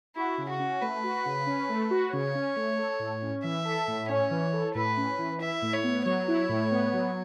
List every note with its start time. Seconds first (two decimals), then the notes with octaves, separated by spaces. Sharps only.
0.16 E4 F#4
0.38 C#3
0.49 F#4
0.60 C#4
0.82 A3 B4
1.04 F#4
1.25 C#3
1.47 C#4
1.69 A3
1.91 F#4
2.13 C#3 C#5
2.35 C#4
2.56 A3
2.79 A4
3.00 A2
3.22 C#4
3.44 E3 E5
3.65 A4
3.87 A2
4.09 C#4 C#5
4.31 E3
4.53 A4
4.74 A2 B4
4.97 C#4
5.18 E3
5.40 E4 E5
5.62 A2
5.74 C#5
5.84 B3
6.06 F#3 C#5
6.28 E4
6.49 A2
6.71 B3
6.93 F#3